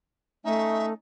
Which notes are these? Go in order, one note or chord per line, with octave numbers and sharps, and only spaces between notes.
A3 C#4 D#4 E5